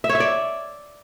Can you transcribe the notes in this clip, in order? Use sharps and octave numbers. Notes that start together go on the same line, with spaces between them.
E5
C#5
E5
D5